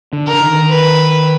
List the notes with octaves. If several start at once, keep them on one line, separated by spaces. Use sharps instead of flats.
D3
A#4
D3
D#3
B4